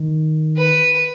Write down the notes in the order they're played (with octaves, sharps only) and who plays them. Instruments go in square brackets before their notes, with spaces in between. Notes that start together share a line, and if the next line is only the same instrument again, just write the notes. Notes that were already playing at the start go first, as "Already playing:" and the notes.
Already playing: [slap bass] D#3
[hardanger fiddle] B4